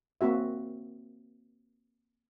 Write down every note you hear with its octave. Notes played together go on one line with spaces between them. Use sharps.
A#3 C4 F#4 E5